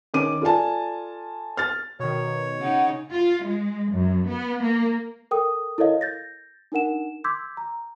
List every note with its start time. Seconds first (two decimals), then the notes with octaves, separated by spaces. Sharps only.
0.14 D#3 C#4 D6 D#7
0.42 F4 A4 D5 G#5 A5
1.57 F6 A6
2.00 B2 D#3 C#5
2.61 C#3 D#4 F#5
3.13 F4
3.44 G#3
3.92 F#2
4.27 B3
4.63 A#3
5.31 A4 A#4 G5 D#6
5.78 E4 A4 A#4 C#5 D#5 F5
6.01 G6 A6 A#6
6.72 D4 D#4 A#4 F#5 E7
7.24 C6 D6 E6 G6 G#6 B6
7.57 A#5